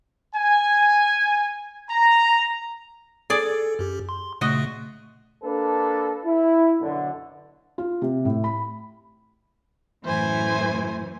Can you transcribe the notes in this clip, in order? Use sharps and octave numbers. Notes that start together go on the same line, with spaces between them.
G#5
A#5
G#4 A4 D5
F#2 G4
C6
A#2 C#3 A3 F#4 D#5
A#3 D4 A4 B4
E4
F#2 B2 D3
F4
C3
A2
B5
F#2 A2 E3 C5 G#5